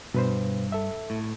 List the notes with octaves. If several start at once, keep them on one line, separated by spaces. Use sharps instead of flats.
G2 B2 B4 C5
A4 E5
A2